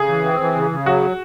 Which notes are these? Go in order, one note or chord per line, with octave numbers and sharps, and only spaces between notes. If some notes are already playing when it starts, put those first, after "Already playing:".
Already playing: C#3 G#4
E3
C4
E3
C#3
C#3
F#3 F#4